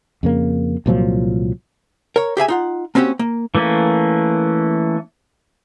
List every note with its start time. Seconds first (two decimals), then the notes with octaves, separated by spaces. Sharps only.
0.23 F2 C#3 A#3
0.86 C2 A#2 F3 F#3
2.16 A#4 C#5
2.37 G4 G#4 E5 G#5
2.48 D#4 F4 F#5
2.95 A#3 C4 C#4 F#4 G4
3.19 A#3
3.55 E3 A3 A#3 C#4